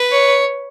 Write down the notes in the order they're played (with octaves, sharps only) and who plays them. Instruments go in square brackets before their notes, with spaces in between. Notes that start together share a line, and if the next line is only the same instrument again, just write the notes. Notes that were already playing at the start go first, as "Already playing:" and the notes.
Already playing: [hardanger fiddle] B4
[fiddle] C#5